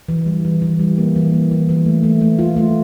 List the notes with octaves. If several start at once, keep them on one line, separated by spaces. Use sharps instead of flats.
E3
G3
E3
E3
G3
A#3
E3
A#3
E3
E3
A3
A3
A3
F4
A3